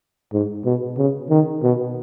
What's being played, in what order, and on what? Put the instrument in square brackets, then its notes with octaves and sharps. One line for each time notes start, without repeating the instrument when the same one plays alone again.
[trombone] G#2
B2
C#3
D#3
B2